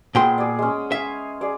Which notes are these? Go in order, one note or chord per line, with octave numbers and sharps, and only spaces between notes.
A#2 B3 G#4 G5 C6
G#4 D5
G#3 C#4
E5 F5 G#5
G#4 D5